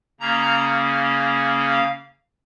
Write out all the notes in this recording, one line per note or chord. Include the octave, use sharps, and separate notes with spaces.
C#3 A#3 C#4 A#5
F5